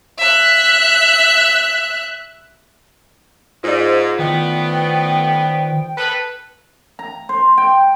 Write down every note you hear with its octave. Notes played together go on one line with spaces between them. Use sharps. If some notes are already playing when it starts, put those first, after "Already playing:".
E5 F#6
G#2 F4 C5 D5
A2 D#3 B3 G5
A4 B4
A#5
C5
G5